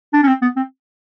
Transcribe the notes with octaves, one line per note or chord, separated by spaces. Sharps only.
D4
C#4
C4
B3
C4